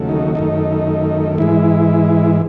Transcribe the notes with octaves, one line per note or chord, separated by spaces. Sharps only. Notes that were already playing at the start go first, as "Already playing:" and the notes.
Already playing: D#2 C#3 F#3 A3
D#4
F#2 D#3 A3 D#4
G#2 E3 G#3 E4